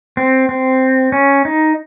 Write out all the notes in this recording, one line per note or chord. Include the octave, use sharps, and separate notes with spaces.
C4
C4
C#4
D#4